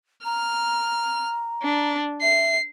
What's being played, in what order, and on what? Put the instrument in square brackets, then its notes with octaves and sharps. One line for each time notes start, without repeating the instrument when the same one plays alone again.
[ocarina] A#5 [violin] F6
[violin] D4
[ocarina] E5 [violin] C7